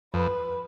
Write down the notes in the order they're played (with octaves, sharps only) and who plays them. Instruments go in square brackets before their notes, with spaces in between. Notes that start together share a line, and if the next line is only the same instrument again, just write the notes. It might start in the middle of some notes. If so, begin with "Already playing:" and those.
[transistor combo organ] F2 [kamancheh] B4